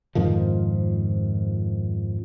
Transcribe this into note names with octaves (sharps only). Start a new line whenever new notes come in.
F2 G#2 D#3 F3